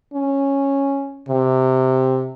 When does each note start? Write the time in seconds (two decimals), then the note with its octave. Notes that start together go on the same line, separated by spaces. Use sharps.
0.14 C#4
1.29 C3